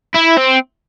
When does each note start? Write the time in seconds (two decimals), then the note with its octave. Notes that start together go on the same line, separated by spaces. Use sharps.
0.14 E4
0.37 C4